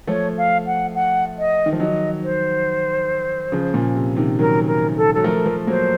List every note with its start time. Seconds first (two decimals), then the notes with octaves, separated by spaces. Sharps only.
0.07 F3 A3 C#5
0.37 F5
0.66 F#5
0.94 F#5
1.38 D#5
1.66 D#3
1.73 F3
1.80 D#3 F#3 D#5
2.23 C5
3.52 C#3 F3
3.74 A#2 C#3
3.95 C3
4.17 C3 D#3
4.39 D#3 F#3 A#4
4.67 A#4
4.96 A4
5.14 F#3 A4
5.24 F3 A3 A#4
5.46 F3 A3
5.67 F#3 A#3 C5